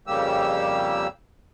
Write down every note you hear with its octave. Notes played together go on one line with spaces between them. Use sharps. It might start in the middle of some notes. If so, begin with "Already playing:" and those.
F2 C#3 G3 A#3 G4 E6